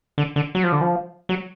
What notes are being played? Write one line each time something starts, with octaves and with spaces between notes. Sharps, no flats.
D3
D3
F#3
F3
D3
F3
F#3